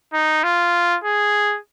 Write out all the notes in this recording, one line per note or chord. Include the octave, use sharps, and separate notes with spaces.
D#4
F4
G#4